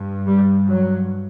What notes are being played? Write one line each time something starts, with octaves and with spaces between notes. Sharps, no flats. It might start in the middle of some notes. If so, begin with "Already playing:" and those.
Already playing: G2
G3
F#3